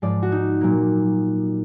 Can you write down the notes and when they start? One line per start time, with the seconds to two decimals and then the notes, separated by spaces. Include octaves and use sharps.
0.02 G#2 F3 G#3 D5
0.23 F#4
0.32 D#4
0.61 A#2 F#3 A#3